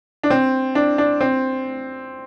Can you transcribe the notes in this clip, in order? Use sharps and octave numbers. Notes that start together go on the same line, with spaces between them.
D4
C4
D4
D4
C4